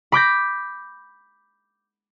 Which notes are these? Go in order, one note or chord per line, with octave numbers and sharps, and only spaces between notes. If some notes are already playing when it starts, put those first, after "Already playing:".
B5 D6 G6 A#6